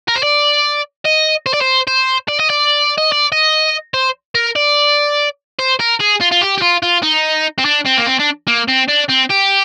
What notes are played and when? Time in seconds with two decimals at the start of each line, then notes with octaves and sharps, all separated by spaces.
0.08 A#4
0.16 C5
0.23 D5
1.05 D#5
1.46 C5
1.54 D5
1.61 C5
1.87 C5
2.29 D5
2.40 D#5
2.50 D5
2.98 D#5
3.12 D5
3.32 D#5
3.94 C5
4.35 A#4
4.56 D5
5.59 C5
5.80 A#4
6.00 G#4
6.21 F4
6.31 F4
6.41 G4
6.58 G4
6.62 F4
6.83 F4
7.03 D#4
7.59 C4
7.65 D4
7.86 C4
7.98 A#3
8.07 C4
8.20 D4
8.48 A#3
8.68 C4
8.89 D4
9.09 C4
9.30 G4